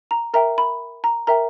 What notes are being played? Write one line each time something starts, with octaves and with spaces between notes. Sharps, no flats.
A#5
A#4 E5 G5 A#5
B5
A#5
A#4 E5 G5 A#5